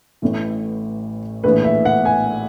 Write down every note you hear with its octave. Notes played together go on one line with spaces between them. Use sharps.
A1 A2 E3
A#1 A2 E3 B4
E5
F#5
G#5